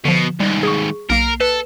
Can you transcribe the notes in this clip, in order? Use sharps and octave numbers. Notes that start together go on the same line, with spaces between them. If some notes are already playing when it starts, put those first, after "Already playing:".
B2 D3 F3
D#2 G#2 G3
G#4 C#6
B1 A#3 A#4 C7
A4 B4